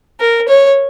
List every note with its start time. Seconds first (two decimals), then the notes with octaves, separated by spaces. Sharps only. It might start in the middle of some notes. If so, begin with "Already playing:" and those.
0.20 A#4
0.49 C#5